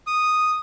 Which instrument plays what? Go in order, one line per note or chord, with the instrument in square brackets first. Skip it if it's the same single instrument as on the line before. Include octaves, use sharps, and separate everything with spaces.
[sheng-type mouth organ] D#6